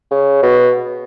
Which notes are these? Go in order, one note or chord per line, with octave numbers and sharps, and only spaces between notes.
C#3
B2